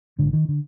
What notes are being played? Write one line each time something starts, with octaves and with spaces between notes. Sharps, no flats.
A#1 G#2 D3
D#3
D3